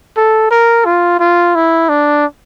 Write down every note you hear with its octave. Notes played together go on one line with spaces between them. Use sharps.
A4
A#4
F4
F4
E4
D4